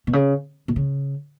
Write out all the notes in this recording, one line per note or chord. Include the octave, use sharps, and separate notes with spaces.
B2
C#3
B2
C#3